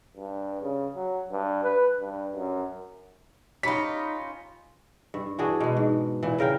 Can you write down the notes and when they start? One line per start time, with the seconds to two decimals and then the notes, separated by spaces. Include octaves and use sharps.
0.16 G2
0.61 C#3
0.96 F#3
1.31 G2
1.64 B4
2.00 G2
2.34 F#2
3.63 C#4 D#4 F4 G4 B5 B6
5.14 G2
5.39 E3 D4 F#4 G#4
5.60 B2 G#3
5.77 G#2
6.23 A#2 E3
6.38 C#3 A#4 F5 G5